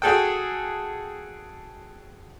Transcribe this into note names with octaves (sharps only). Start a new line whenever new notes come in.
F#4 G#4 A4 G5